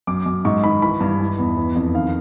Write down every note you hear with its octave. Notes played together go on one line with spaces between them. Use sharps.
F#2 D6
F#2
G#2 C#6
D#3 B5
E3 B5
G2
E3
E2
E3
F2
D#3 F5